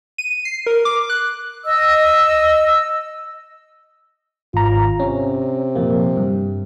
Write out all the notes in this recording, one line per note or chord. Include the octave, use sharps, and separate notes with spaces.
D#7
C7
A#4
D6
F#6
D#5 E6
G#1 F4 A#5
C3 C#4
F2 A#2 A#3
G2